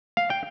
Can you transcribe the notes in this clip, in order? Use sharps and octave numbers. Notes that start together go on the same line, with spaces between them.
F5
G5